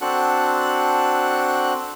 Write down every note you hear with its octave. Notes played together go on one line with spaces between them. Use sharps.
C4 D4 F#4 A4 F#5 F#6